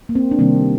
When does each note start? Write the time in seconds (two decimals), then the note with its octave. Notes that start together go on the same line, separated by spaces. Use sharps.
0.09 A#3
0.15 C4
0.31 D4
0.39 C3 D#3 G3 A#3 C4